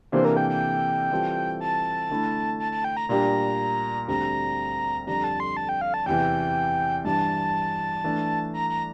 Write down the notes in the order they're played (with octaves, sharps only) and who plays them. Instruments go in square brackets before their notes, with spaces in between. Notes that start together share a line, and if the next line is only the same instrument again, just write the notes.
[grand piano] C3 E3 A#3 D4 A4 [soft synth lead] C5
[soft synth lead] A#4
G5
G5
[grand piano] E3 G3 C4 F4 A4
[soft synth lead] A5
[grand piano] D3 A3 E4
[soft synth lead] A5
A5
G5
A#5
[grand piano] A#2 G3 D4 G4 [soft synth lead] A#5
[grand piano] D2 D3 G3 C4 [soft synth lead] A#5
[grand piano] F2 D3 G3 D4 [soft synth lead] A#5
[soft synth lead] A5
C6
A5
G5
F5
A5
[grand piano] E2 C3 E3 [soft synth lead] G5
[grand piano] G2 E3 G3 D4 [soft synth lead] A5
[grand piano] E3 A3 D4
[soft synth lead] A#5
A#5